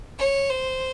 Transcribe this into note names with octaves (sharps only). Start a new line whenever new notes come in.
C#5
C5